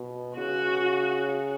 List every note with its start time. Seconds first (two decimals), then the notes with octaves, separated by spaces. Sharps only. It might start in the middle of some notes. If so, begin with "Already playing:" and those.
Already playing: B2
0.37 C#3 F#4